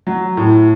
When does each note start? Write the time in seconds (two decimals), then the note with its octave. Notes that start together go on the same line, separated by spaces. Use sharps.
0.07 F#3
0.37 A2